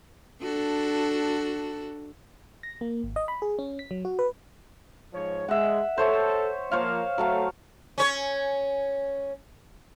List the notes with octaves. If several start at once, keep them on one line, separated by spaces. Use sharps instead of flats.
D4 F#4 A4
A#6
A#3
G#1
D#5
B5
G#4
C#4
B6
F#3
F#4
B4
G#2 F3 C#5
G#3 E5 F#5
A4 C5 C#5 E5
F3 A#3 C5 C#5 F5
F#3 A3 A4 F5
C#4 C#5